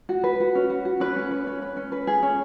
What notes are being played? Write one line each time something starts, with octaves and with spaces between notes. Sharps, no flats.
F#4
B4
F#4
C#4
F#4
F#4
C#4 B4
C#4
B4
C#4
B4
C#4
B4
G#4
C#4